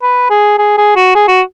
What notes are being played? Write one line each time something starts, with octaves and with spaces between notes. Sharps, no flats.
B4
G#4
G#4
G#4
F#4
G#4
F#4